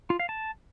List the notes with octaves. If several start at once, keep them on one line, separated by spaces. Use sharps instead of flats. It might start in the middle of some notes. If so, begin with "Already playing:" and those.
F4
F5
A5